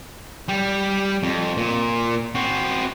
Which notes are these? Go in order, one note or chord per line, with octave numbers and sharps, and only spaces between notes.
G3
F2
A#2
C4 F#4